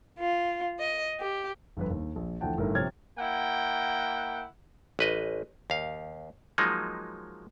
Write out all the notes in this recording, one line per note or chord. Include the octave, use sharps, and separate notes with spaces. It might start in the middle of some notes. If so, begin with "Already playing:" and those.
F4
D#5
G4
G1 F2 B4
D#2
A#1
D2 E3 F3 F#5 G5 A5
G1 A2 D#3 A#4
C3 F3 C#5 F6 G#6 A6
A#3 E4 F#5 G5
A1 B4 D#5
D#2 F5
F3 F#3 G#3 A#3 D#4